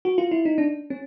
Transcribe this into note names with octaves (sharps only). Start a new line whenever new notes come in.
F#4
F4
E4
D#4
D4
C#4